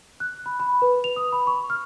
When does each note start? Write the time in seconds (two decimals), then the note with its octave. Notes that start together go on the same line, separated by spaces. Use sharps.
0.20 F#6
0.46 B5
0.60 B5
0.82 B4
1.04 F7
1.16 D#6
1.32 B5
1.47 C#6
1.70 F6